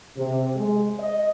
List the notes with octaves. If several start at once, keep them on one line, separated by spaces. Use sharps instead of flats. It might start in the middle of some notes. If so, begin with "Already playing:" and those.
C3
G#3
D#5